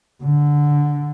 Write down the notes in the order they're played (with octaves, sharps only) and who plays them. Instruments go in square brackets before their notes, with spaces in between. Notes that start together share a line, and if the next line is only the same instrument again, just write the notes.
[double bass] D3